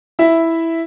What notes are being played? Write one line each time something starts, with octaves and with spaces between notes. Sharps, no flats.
E4 E5